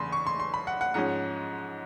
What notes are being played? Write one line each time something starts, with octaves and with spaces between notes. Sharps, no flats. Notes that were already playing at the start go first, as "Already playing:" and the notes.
Already playing: E2 C#3 G#5 B5 C6
C#6
C6
C6
B5
F#5
F#5
G#2 F3 G#3 C#4 F#5